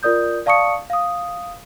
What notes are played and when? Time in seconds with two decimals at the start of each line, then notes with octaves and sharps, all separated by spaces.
0.03 F4 A#4 D5 D#6 G6
0.46 D5 F5 A5 C#6 D#6 C#7
0.90 F5 D#6